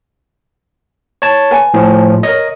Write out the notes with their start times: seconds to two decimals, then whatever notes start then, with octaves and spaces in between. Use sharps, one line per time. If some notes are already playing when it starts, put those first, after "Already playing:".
1.22 C#5 A5
1.51 B4 G#5
1.74 A2 F3
2.23 A#4 C#5 D#5